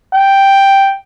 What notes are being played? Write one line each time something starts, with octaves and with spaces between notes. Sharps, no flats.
G5